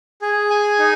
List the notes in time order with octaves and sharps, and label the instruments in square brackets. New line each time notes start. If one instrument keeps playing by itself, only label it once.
[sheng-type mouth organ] G#4
G#5
D#4